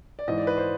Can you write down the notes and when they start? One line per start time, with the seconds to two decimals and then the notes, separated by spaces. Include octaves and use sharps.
0.19 D5
0.28 G#2 E3 D#5
0.38 D5
0.47 B4
0.57 C5